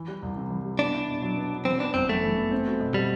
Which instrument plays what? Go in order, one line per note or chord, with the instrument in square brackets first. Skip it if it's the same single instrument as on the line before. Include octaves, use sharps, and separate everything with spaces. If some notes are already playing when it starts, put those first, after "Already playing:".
Already playing: [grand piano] E3
G3
C2
C3
E3
G3
[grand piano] B3 [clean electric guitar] D4
[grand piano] E4
B2
F#3
B3
E4
[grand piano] E3 [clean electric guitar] C4
[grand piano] B3 [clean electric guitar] D4
[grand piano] G1 [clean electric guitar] C4
[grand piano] F#2 [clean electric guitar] A3
[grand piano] E3
B3
C4
F#4
B2
[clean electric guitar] G3 [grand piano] A3